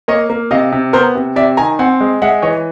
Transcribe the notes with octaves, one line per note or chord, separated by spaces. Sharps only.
A#3 C#5 D#5
A#3
C3 D#5 F5
C3
B3 A#4 C5
C3
C3 D5 E5
D#3 G#5 A#5
C4 F#5 G#5
G#3
G#3 E5 F#5
E3 C#5 D#5